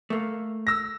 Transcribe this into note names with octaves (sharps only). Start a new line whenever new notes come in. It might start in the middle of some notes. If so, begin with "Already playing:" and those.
A3 A#3
E6 A#6